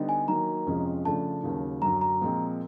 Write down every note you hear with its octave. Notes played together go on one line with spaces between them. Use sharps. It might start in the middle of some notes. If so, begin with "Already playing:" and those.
Already playing: D3 G3 B3 D#4
G#5
D#3 F#3 A#3 A#5
F2 C3 F3 G#3 C#4
C#3 F3 A3 D4 A5
D#2 C#3 F#3 A#3
F#2 D3 F#3 A#5
A#5
A#2 F3 G#3 C4